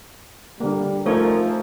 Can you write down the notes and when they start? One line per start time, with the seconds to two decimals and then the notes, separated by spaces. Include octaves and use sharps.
0.60 D3 G3 A#3
1.06 F3 A3 C#4 D#4 A4 A#4 C#5